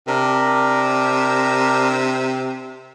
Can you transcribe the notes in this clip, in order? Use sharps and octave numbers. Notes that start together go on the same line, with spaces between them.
C3 D4 A#4